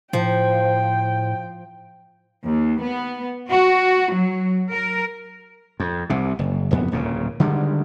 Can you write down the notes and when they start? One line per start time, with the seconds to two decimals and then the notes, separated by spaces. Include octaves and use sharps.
0.13 A2 F3 G5
2.44 D#2
2.81 B3
3.49 F#4
4.13 F#3
4.72 A#4
5.80 F2
6.10 C2 C3
6.39 F#1
6.71 F#1 F2 B3
6.92 D1 A#2 C#3
7.40 D3 D#3 G3 G#3